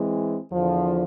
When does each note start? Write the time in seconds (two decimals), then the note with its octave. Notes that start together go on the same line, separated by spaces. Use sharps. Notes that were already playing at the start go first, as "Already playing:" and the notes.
Already playing: E3 G#3 C4
0.52 E2 D3 F3